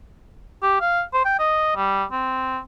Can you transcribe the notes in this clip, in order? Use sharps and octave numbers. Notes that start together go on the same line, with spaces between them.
G4
F5
C5
G5
D#5
G3
C4